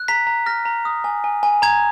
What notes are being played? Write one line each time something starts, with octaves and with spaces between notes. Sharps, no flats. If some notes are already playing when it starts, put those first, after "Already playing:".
Already playing: F#6
A#5 B6
A#5
F6 A#6
A#5
D#6
G#5
G#5
G#5
A#5 G#6